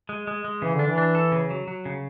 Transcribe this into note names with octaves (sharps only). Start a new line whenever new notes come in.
G#3
G#3
G#3
C#3 E3
D3 D4
E3
D4
A4
C#3
F#3
F#3
C#3